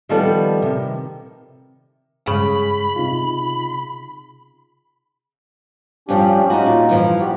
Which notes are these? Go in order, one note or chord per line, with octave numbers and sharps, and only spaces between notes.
D#3 F3 G3 B3 A4 B4
C3 D#3
G2 C#3 G#3 B5
C3 D#4 F4
G2 F3 G3 C#4 D4 G4
C#4 D#4 F4 F#4
A#2
G2 E3 F3
D#4
A#2 F#4 G4